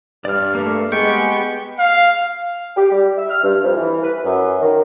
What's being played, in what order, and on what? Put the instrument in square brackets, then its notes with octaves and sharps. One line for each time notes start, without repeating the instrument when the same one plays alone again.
[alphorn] G2 [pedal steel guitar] D5 F6
[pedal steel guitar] A3 A#3
[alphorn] G#3 [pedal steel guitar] B3 G4 [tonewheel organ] G5 C#6
[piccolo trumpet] F5
[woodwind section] G4
G3
E5
F6
G2
F2
E3
B4
F#2
D#3